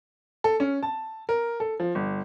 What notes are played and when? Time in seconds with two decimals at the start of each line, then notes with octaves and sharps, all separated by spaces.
0.44 A4
0.60 C#4
0.83 A5
1.29 A#4
1.60 A4
1.80 F3
1.95 G1